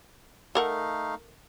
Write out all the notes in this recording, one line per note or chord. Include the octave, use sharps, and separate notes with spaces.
A3 D#4 A4 A#4 F5 F#5